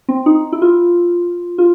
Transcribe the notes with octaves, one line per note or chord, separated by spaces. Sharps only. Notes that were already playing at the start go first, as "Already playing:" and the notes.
C4
D#4
E4
F4
F4